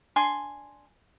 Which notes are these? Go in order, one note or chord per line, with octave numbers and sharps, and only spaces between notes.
D4 G#5 C6